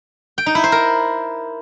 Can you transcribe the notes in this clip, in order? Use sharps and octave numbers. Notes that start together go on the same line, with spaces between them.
G5
D#4
E4
C5
A#4